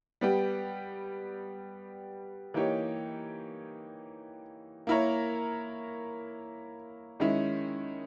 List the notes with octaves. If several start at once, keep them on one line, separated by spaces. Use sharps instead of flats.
G3 B3 G4
E3 A#3 D#4 G4 C#5
A#3 E4 A#4 C#5
D#3 G#3 C#4 E4